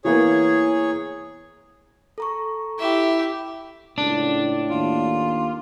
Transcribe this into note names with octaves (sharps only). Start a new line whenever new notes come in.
E3 A#3 B3 G#4 C#5
A4 A#5 C#6
E4 G4 E5
C#2 A2 D4
D#2 F4